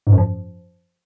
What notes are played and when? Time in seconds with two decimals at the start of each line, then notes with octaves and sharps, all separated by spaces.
0.07 G#2
0.12 F#2
0.18 F3